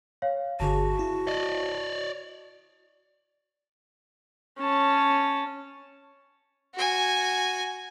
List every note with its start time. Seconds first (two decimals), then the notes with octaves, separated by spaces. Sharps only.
0.22 C#5 F5
0.60 G1 D3 F#4 G#4 A5
0.99 E4
1.27 D5 D#5
4.59 C#4 A5
6.75 F#4 G#5